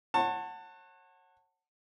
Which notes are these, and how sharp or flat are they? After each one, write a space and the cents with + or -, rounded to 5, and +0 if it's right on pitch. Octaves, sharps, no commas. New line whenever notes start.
C#5 -35 F#5 +0 A5 +25